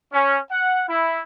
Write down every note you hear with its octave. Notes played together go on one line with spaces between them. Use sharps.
C#4
F#5
E4